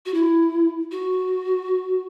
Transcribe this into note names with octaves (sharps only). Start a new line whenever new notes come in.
F#4
E4
F#4